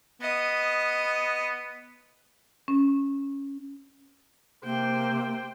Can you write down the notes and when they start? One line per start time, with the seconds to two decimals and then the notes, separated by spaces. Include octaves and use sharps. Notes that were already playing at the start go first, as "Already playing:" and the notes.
0.22 B3 D#5
2.68 C#4
4.65 C3 A#3 C5 G5